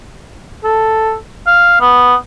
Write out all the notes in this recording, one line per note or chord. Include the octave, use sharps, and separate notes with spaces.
A4
F5
B3